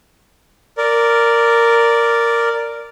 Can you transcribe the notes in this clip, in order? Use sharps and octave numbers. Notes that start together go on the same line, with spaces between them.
A#4 D5